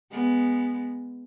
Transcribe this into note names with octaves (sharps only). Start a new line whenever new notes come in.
G#3 B3